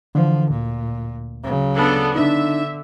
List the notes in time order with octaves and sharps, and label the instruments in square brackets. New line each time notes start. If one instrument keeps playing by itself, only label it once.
[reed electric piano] D3 E3 [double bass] F3
[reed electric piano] D2 [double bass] A#2
[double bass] C#3 F#3
[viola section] B3 D4 A4
[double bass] D3 [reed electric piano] D4 D#4 [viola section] E5